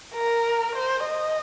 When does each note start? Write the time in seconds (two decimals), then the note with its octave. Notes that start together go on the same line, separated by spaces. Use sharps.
0.14 A#4
0.75 C5
1.05 D#5